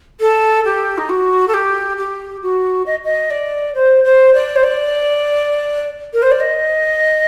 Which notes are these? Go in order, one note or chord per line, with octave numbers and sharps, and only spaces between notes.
A4
G4
D#4
F#4
A4
G4
G4
F#4
D#5
D#5
D5
C5
C5
D5
C5
D5
A#4
C5
D5
D#5